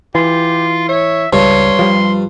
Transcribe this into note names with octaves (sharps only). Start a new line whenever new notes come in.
E3 F4 G4
C#5 E5
C#2 G2 C#5 C6
F3 G3